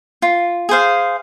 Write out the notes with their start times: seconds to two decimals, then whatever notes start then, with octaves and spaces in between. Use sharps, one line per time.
0.22 F4
0.69 G#4 C5 F5